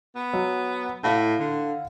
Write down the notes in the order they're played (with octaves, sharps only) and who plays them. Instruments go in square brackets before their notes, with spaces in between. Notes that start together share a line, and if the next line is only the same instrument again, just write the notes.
[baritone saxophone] B3
[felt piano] F#3
[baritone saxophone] A2 [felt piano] E4 F5 F#5
[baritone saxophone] D3